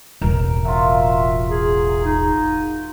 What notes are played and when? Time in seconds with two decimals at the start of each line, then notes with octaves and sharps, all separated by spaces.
0.21 E1 A1 A#4
0.65 F#3 F4 E5
1.50 G#4
2.05 D#4